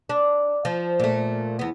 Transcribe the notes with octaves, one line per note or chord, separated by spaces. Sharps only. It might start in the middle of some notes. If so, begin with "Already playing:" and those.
D4
F3
A#2 A3
E2 B3